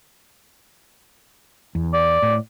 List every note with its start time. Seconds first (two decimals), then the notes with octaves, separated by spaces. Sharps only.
1.75 E2
1.93 D5
2.22 A2